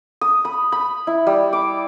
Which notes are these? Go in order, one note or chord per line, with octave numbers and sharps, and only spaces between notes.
D#6
B5
B5
E4
G3
D6